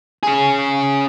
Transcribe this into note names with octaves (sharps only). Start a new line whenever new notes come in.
C#4 G#4